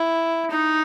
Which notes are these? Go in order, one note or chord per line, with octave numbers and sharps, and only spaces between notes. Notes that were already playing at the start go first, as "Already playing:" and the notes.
Already playing: E4
D#4